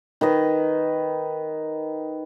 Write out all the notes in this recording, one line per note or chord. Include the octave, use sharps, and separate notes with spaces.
D#3 B4 D#5